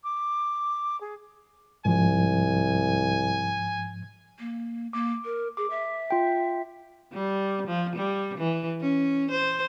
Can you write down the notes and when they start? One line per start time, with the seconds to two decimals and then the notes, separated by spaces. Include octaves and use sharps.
0.03 D6
1.01 G#4
1.86 C2 G#2 F3 G#5
4.40 A#3
4.93 A#3 D6
5.25 A#4
5.57 G#4 D6
5.70 E5
6.11 F4 G5
7.13 G3
7.68 F3
7.96 G3
8.38 E3
8.81 C#4
9.31 C5